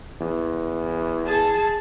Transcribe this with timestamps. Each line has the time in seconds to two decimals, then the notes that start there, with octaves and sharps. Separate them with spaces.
0.20 E2
1.25 G#4 A5